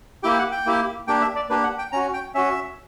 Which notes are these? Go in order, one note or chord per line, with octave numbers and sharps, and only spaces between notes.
A#3 E4 G4 G5
F#5
G5
A#3 E4 G4
A#3 D4 G4 G5
E5
D5
A#3 D4 G4 B4
F#5
G5
C#4 F#4 A#5
G5
C#4 F#4 E5